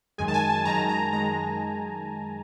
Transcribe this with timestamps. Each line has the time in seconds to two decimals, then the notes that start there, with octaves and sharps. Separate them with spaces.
0.18 F#2 D#3 G#3 G#5
0.28 A5
0.34 G#5
0.50 A5
0.65 F#2 D#3 G#3 A#5
0.89 A#5
1.13 D#3 G#3 A#5